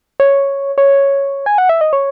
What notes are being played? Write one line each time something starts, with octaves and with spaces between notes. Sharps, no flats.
C#5
C#5
G#5
F#5
E5
D#5
C#5